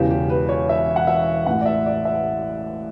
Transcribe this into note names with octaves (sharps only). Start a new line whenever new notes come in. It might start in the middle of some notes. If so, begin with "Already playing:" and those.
Already playing: E1 E2 C#3 E3 G4
G4
B4
C#5
E5
F#5
E5
A1 A2 E3 F#5
D5
E5
D5
E5